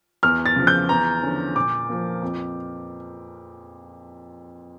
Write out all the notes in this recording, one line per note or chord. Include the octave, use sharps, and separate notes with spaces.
E2 F6
A6
C#3 F3
G6
E2 A#5
D3 F3 C#4
A#2 D6
F3 A#3
F2